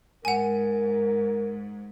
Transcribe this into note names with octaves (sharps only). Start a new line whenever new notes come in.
G#2 A#4 F#5 G#5